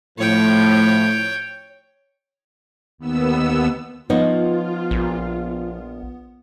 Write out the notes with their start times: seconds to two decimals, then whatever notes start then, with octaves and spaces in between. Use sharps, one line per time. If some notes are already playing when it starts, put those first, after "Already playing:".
0.19 A2 F3 C#5 G5
2.98 D#2 B3 E6
4.10 F3 B3 D#4 F4 C#5
4.91 A#1